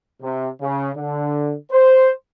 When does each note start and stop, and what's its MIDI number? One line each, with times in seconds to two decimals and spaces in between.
0.22 0.48 48
0.60 0.89 49
0.96 1.54 50
1.71 2.11 72